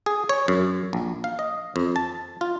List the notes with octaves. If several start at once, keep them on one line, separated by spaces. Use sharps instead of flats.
G#4
C#5
F#2
A#1
F5
D#5
F2
A5
F4